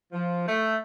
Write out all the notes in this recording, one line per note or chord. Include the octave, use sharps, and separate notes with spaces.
F3
A3